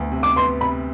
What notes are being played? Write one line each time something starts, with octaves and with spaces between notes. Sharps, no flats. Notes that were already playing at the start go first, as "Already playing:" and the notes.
Already playing: D2 B3
C3
D6
B3 C6
C3 B5